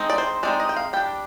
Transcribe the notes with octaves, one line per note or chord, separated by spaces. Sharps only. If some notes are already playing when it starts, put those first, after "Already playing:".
Already playing: G#3 C4 D#4
D5
C5
G#3 C4 D#4 D5
D#5
G5
F5
G3 D4 G5